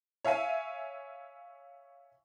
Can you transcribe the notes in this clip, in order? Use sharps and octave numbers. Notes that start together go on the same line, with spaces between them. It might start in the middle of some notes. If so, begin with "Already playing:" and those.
C#5 E5 F5 G#5